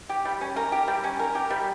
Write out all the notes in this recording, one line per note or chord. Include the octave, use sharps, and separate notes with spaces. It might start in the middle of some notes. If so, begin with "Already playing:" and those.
G4
G3
C#4
A#4
G4
G3
C#4
A#4
G4
G3